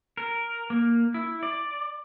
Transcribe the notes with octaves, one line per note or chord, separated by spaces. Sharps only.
A#4
A#3
E4
D5